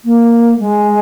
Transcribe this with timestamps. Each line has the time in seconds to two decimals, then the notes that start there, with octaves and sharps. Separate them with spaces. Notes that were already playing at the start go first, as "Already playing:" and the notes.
0.05 A#3
0.59 G#3